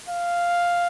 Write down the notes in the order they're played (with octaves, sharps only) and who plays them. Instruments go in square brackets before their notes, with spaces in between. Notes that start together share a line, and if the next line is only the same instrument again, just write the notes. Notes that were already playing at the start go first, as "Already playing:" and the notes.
[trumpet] F5